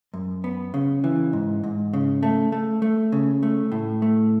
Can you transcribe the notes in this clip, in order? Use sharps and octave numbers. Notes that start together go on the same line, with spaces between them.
F#2
B3
C#3
E3
G#2
G#2
C#3
A3
A3
A3
C#3
A3
A2
A3